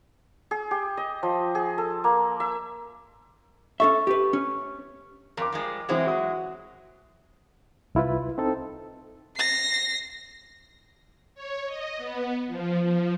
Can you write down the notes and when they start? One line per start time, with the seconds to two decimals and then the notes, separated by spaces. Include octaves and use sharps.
0.51 G#4
0.71 G4
0.97 D#5
1.23 F3
1.55 G#4
1.78 A4
2.04 A#3
2.40 E5
3.80 C#4 A4 E5 C#6
4.07 G4 B4
4.33 C#4
5.37 F2 A#4 D6
5.52 F3 G3 G#3
5.89 E3 F#3 G#3 C4 E4 G#4
6.07 F#4 D#6
7.95 C2 E4 F4 B4
8.38 C4 D#4 A4
9.36 A#6 C7
11.35 C#5
11.66 D#5
11.97 B3
12.47 F3
12.82 F3